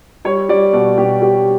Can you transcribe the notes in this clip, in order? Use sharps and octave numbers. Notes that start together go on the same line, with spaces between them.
G3 C#5
G3 D5
B2 D5
B2 G4
G3 G4